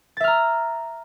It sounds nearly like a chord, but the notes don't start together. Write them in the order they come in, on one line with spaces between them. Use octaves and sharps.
A6 E5 F6 A#5